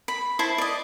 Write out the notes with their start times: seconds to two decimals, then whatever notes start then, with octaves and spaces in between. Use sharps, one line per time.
0.08 B5
0.39 E4 C5 E5 A5
0.58 D5 D#5